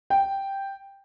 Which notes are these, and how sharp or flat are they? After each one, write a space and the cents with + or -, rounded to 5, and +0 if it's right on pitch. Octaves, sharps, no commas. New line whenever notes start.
G5 +0